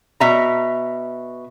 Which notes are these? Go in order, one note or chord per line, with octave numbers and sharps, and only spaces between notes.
B2 E5 A#5